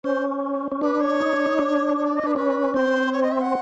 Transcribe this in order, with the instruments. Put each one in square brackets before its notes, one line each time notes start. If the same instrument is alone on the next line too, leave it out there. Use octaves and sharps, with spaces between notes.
[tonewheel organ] C#4 [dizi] C5
[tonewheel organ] C#4
[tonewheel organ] D4 [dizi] B4
[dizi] C#5
[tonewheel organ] D#4
D4
D#4
D4
[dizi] C#5
D5
D#5
[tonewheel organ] D4 [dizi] B4
[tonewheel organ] C#4 [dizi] B4
[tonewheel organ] C4 [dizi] C5
[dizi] C#5
D#5
E5
F#5